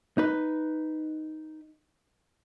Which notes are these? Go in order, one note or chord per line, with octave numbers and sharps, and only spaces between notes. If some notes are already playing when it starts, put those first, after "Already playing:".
D#4 B4